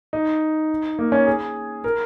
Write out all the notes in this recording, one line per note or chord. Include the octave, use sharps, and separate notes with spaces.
D#4
A#3
C#4
G#4
A#4